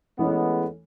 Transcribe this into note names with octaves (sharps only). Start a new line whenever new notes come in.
E3 G#3 A3 B3 C#4